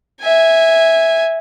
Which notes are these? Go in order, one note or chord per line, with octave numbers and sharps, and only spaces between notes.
E5 G#5